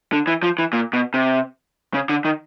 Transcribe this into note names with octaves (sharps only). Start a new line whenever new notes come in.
D3
E3
F3
E3
A#2
B2
C3
C#3
D3
D#3